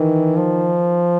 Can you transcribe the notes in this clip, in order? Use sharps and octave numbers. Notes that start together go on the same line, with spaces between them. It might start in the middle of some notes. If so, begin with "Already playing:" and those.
Already playing: D#3 E3
F3